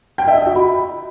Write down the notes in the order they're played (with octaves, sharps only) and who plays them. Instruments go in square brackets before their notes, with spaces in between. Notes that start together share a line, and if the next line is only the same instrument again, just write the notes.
[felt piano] G5
E5
D#5
F#4
B5